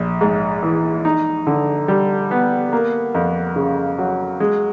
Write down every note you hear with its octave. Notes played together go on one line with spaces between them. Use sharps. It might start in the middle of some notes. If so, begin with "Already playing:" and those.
Already playing: A#1
G#2
E3
D#4
D3
G3
B3
A#3
F2
C#3
F#3
G#3